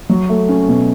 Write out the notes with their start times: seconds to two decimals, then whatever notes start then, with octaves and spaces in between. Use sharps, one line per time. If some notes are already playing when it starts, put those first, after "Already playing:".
0.09 F#3
0.29 A3
0.49 C#4
0.68 B2